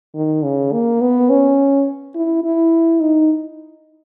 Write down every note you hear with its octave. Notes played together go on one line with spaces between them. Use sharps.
D#3
C#3
A#3
B3
C#4
E4
E4
D#4